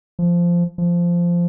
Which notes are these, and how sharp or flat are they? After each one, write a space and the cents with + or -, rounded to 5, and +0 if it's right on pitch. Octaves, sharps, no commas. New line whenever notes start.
F3 -10
F3 -10